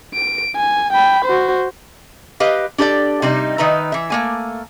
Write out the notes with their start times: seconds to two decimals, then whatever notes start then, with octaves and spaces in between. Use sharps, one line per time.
0.14 D7
0.56 G#5
0.93 G5 B5
1.25 F#4 C5
2.40 G4 B4 D#5 F5
2.78 D4 G4 A4 D5
3.22 C3 G3 D#4
3.58 D#3 D#4 B4 E5 A#5
3.92 E3 E5
4.10 A3 A#3 G#5